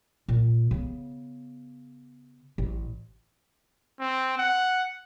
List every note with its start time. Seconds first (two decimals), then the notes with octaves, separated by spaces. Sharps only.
0.28 A#2
0.71 C#3 B3
2.58 A1
4.00 C4
4.38 F#5